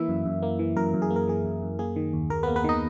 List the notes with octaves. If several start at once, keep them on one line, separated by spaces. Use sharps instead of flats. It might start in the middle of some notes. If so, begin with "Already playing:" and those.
Already playing: E3 A#3 E4 E5
F#2
F#2
A#3
E3
F#2 A#4
F#2
G#4
A#3
A#4
E3 G#4
F#2
F#2
A#3 G#4
D#3
D#2
D#2 A#4
B3 B4
A#3
B3 B4
D#3 D#4 D#5